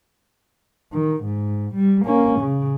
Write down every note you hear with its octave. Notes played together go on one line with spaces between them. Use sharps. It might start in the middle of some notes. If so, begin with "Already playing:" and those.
D#3
G#2
G3
A#3 C#4
C#3